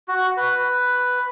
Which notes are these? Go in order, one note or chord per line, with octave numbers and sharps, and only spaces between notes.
F#4
B4